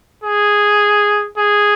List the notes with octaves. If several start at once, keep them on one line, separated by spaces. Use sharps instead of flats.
G#4
G#4